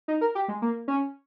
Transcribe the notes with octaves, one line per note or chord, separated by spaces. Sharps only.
D#4
A#4
G4
G#3
A#3
C#4